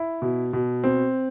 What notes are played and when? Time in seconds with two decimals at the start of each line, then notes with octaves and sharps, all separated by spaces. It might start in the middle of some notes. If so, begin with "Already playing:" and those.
Already playing: E4
0.22 B2
0.53 B2
0.84 C4